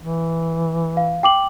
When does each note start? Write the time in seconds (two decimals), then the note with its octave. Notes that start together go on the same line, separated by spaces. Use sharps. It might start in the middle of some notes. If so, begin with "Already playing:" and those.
0.01 E3
0.97 F5
1.23 G5 D6 F#7